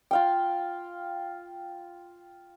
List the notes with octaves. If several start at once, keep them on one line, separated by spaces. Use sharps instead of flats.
F4 F5 G5